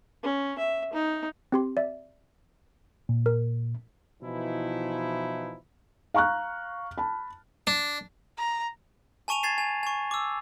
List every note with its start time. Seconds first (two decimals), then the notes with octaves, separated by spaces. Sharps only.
0.23 C#4
0.58 E5
0.93 D#4
1.52 C4 G4 C6
1.77 D5 E5
3.09 A#2
3.26 A#4
4.23 B2 E3 F3 D#4 E4
6.14 F5 A#5 C#6 F6 F#6
6.98 A5 B5
7.67 D4
8.38 A#5
9.28 G#5 A5 C#6 D#7 F7
9.43 G#6 A6 C7 E7
9.58 G#5
9.83 G#5 C#6
10.11 D6 E6